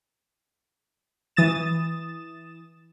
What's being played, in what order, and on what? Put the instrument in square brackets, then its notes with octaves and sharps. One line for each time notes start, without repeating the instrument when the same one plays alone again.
[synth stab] E3 D#6 A6 E7